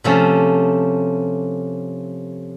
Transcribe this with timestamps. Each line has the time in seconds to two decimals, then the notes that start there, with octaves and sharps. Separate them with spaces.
0.04 C3 F3 A3 C#4